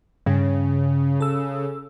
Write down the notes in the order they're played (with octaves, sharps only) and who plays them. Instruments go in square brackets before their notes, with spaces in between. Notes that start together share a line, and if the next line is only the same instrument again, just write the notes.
[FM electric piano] G2 [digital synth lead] C#3
[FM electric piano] A4 E6